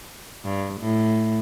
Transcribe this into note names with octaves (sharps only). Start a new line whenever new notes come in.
G2
A2